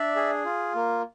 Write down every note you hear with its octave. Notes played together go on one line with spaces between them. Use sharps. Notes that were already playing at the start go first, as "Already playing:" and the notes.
Already playing: D4 D5 E5
G#4
F4
A#3